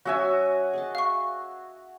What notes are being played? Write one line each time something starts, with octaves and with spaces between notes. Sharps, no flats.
F#3 C#4 F#4 E5 G#5
G#4 D#5 A5
F5 C#6